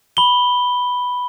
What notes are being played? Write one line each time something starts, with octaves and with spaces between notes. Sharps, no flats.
B5 G7